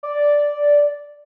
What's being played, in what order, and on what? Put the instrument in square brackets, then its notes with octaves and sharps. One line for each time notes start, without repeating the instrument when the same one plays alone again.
[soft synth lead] D5